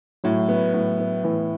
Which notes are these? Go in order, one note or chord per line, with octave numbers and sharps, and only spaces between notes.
A2 F#3
B3
A2
B3
A2 E3